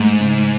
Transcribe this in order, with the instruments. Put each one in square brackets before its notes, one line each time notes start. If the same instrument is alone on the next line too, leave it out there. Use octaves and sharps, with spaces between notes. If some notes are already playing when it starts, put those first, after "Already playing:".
Already playing: [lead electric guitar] G#2 [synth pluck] A3
[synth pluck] C#3